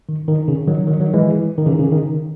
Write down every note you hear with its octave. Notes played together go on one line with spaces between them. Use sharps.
D#3
D#3
C#3
D#3 F#3
D#3 F#3
D#3 F#3
E3 G#3
D#3
C#3 E3
C#3
D#3